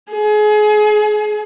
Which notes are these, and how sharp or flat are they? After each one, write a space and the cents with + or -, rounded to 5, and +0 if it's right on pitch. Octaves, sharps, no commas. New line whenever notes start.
G#4 +30